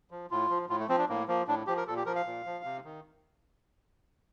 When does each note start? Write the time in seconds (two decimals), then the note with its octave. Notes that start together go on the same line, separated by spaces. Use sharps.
0.11 F3
0.31 A2 F4
0.50 F3
0.69 A2 F4
0.80 A3
0.88 F3 C4
0.98 D4
1.09 A2 A#3
1.28 F3 A#3
1.48 A2 D4
1.67 F3 G4
1.77 A#4
1.87 A#2 A4
1.97 G4
2.06 F3 A#4
2.16 F5
2.26 A#2
2.46 F3
2.64 C3
2.85 D#3